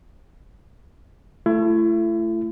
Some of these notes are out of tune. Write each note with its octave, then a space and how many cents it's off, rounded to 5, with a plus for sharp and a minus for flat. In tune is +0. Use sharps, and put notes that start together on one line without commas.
A3 +0 E4 +35